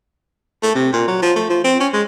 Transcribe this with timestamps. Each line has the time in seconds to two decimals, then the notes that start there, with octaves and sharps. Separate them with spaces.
0.63 A3
0.75 C3
0.93 A#2
1.08 F#3
1.22 F3
1.36 A3
1.50 F3
1.64 C4
1.80 C#4
1.93 G#3